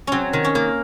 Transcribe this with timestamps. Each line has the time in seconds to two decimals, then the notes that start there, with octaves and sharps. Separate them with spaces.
0.07 F#3 C4 C#4
0.33 D#3
0.45 C#4
0.55 A#3